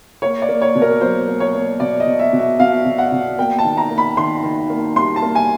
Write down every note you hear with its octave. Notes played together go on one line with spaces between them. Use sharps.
A#3 C#5
D5
A#3
C#5
B2
A#4
F#3 C5
A#3
C#5
A#3
B2 D5
D#5
B2
E5
B2
E5
B2 F5
B2
F#5
B2
A#3 G5
A5
D#3
A#5
A#3
B5
D#3 C6
D#3
A#3
G3 C6
A5
A#3
G#5